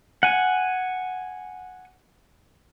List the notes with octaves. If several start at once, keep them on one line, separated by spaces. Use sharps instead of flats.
F#5 G#5